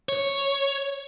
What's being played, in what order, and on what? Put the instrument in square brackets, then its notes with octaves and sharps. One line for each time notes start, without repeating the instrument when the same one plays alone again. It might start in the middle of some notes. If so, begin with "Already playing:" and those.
[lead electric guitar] C#5